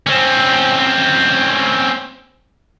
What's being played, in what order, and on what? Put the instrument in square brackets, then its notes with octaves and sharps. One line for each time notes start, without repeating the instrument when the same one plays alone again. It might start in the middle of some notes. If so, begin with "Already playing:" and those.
[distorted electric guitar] C4 C#4